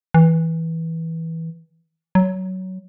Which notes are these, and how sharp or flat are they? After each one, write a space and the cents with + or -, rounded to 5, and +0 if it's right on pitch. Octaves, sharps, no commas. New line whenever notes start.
E3 -15
F#3 +15